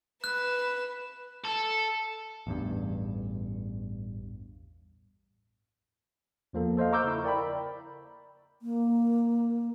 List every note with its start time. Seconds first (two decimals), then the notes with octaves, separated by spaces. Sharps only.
0.24 B4 F#6 E7
1.44 A4
2.47 A1 E2 G2
6.53 E2 F3 A#3 A4
6.77 A4 C5 D#5 F5
6.93 A#5 C#6 D6 E6 F6 G6
7.04 C#3 E4
7.24 A#4 D5 G5 A#5 B5
8.62 A#3